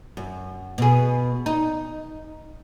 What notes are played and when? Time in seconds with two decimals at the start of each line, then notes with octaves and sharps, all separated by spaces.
0.17 F#2
0.78 B2 G#4
1.46 D#4